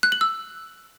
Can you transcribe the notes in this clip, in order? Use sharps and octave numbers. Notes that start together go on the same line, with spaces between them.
F#6
F#7
E6